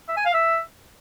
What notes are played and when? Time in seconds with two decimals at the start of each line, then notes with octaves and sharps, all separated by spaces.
0.08 E5
0.17 G#5
0.25 F5
0.34 E5